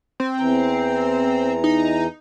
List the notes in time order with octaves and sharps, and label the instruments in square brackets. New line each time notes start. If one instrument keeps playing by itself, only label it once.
[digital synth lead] C4
[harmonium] E2 E3 A#5
[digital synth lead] D#4